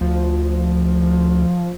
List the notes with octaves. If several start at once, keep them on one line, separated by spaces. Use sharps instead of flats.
D2 F3